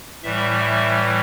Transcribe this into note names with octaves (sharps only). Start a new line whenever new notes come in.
A2 E3 G3 E5
E5